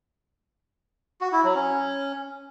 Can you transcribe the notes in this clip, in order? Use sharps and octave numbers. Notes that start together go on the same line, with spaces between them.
F#4
E4
F#3
C#4